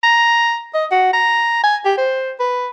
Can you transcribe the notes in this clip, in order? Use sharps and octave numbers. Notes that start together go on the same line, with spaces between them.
A#5
D#5
F#4
A#5
G#5
G4
C5
B4